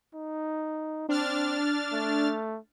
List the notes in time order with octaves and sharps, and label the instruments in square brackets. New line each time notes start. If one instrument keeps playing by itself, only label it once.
[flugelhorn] D#4
[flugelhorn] C4 [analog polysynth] D4 F6 A6
[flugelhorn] A3